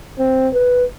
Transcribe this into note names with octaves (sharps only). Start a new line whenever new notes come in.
C4
B4